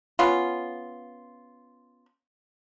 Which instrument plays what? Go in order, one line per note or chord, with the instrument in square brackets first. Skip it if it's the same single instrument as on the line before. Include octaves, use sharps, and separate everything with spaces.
[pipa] B3 C#4 F4